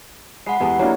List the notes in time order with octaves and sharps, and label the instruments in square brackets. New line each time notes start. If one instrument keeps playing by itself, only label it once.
[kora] G#3 [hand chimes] F#5 B5 C7
[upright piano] E2 [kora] G#3 B3 A4 [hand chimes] G4
[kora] F#3 F5 [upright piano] A#3 D4 E4